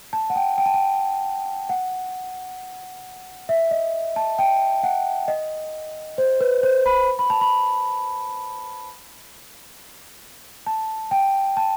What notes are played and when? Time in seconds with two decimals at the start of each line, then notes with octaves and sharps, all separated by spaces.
0.13 A5
0.30 F#5
0.36 G5
0.58 G5
0.66 A5
0.74 G5
1.69 F#5
3.49 E5
3.71 D#5
4.16 A5
4.39 G5
4.83 F#5
5.28 D#5
6.18 C5
6.41 B4
6.63 C5
6.86 B5
7.19 B5
7.30 A5
7.41 B5
10.67 A5
11.11 G5
11.57 A5